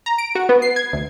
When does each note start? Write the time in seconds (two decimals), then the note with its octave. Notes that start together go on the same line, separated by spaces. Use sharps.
0.06 A#5
0.18 D7
0.35 F#4
0.49 B3
0.62 C7
0.76 G#6
0.93 D2